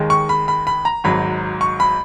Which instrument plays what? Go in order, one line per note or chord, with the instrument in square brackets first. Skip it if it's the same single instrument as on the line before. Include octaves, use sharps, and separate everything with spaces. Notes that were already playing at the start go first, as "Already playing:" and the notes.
Already playing: [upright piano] D#2 D#3 G#3
C#6
B5
B5
B5
A#5
G#1 G#2 F#3 B5
C#6
B5